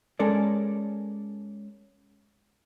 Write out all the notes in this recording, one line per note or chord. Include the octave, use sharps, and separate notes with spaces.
G#3 C#4 A4 A#4 D5